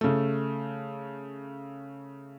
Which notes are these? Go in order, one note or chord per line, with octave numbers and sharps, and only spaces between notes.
C#3 A3